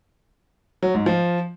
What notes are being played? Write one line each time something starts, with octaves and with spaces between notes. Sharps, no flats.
F#3
G#2
F3